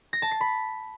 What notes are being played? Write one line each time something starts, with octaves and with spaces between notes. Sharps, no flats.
A#6
A5
C7
B5